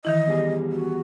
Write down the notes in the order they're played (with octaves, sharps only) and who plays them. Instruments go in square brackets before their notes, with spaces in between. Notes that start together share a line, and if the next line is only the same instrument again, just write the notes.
[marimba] D#3 E3 E4 [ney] D#5
[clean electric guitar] E2 G3 G#4
[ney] F#4